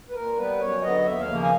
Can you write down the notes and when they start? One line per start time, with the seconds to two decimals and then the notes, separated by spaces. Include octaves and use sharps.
0.09 B4
0.15 A#2 A#4
0.37 G3 B3 B4
0.60 F#2 C#5
0.83 D3 F#3 B3 D#5
1.05 D#2 E5
1.21 F5
1.28 C#3 F3 A#3
1.43 G#5